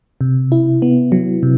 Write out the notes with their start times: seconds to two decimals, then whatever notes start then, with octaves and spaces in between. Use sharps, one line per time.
0.21 C3
0.52 E4
0.82 B3
1.12 F#3
1.43 C3